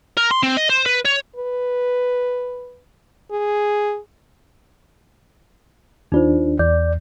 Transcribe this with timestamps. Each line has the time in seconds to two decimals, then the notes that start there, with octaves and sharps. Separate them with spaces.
0.17 A#4
0.31 C6
0.43 C4
0.57 D#5
0.69 C5
0.86 B4
1.05 C#5
1.36 B4
3.31 G#4
6.12 D#2 D4 D#4 F4 C5
6.59 E2 D5 G6